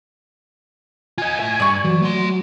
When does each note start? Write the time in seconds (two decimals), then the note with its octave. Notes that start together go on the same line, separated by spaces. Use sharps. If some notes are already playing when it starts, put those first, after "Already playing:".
1.18 F4 D#5 G#5
1.40 A2 E5 G#5
1.60 G2 D5 C#6
1.84 E3 F#3
2.02 A3 C6